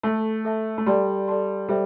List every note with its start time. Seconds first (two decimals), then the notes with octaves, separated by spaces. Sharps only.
0.03 A3 A4 E5 A5
0.45 A4 E5 A5
0.78 A3
0.86 G3 A4 D5 A5 C6
1.28 A4 D5 A5 C6
1.68 G3 A4 C5 E5